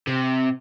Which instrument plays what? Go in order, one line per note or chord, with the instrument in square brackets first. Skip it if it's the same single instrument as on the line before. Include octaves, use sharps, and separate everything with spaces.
[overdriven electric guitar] C3